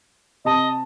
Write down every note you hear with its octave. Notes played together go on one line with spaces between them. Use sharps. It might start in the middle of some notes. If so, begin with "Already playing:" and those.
C3 D#5 A5